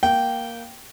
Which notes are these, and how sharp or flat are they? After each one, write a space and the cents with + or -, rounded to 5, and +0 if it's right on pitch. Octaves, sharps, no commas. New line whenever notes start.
A#3 +0 G5 -10